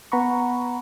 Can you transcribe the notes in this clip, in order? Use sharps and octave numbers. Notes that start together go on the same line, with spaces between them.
B3 F#5 A#5 B5 C#6